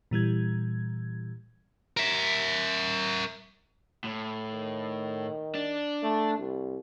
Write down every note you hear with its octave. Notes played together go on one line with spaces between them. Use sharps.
A#2 E3 G3 G#6
A#4 E5
A2
D#3
D4
A3
C2